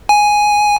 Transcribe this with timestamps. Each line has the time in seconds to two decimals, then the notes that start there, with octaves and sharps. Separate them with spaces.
0.09 G#5